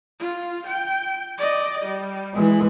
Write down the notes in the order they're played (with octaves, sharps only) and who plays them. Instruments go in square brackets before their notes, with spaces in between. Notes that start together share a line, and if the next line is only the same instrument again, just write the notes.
[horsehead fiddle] F4
G5
D5 D#5
G3
[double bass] E3 G#3